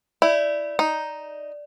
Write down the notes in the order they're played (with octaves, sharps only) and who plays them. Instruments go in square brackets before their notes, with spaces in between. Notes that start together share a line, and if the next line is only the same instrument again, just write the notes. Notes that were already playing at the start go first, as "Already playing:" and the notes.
[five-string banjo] E4 [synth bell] D5
[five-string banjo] D#4